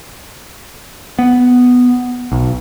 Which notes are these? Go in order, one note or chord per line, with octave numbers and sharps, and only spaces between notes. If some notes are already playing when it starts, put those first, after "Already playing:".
B3
B1